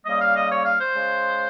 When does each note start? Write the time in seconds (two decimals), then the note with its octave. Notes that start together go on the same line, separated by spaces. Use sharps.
0.05 C#3 G3 A#3 D#5
0.20 F5
0.35 D#5
0.51 C#5
0.65 F5
0.79 C5
0.95 C#3 G#3